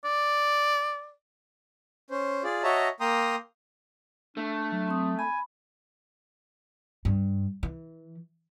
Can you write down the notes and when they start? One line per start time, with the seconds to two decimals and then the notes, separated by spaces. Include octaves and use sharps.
0.04 D5
2.10 C#4 C5
2.44 F4 G#4 D5
2.63 F#4 C#5 D#5 E5 A5 A#5
3.00 A#3 G5 A#5 C6 D#6
4.37 A3 D4
4.72 F#3
4.88 C4 D#6
5.19 G#5 B5
7.05 G2
7.63 E3